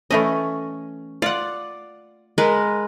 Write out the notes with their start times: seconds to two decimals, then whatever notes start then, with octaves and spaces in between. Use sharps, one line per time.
0.11 E3 A3 C#4 D#5
1.22 F4 D5 F#5
2.38 G#3 A#4 B4